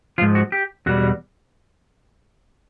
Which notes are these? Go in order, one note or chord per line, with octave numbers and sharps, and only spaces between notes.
G#2 F3 F4
F#4
G4
E2 B2 G3 F#4